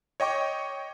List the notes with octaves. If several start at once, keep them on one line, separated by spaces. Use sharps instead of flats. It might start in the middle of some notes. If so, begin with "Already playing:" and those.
C#5 D#5 G5 C#6 D6